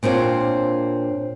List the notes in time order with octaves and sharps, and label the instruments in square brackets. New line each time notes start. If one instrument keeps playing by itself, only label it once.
[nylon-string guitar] A#2 C4 D4 F4 C#5